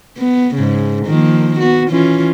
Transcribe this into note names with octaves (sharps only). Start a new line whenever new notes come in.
B3
G#2 C#3
D#3 F3 A#3
B3 F#4
E3 C#4 F4